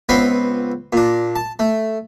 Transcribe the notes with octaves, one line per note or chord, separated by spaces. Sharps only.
C#2 B3 C4 C#5 B5 C6
A#2 D4
A5
A3